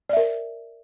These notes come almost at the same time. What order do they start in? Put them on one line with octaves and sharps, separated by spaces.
D5 E5 A#4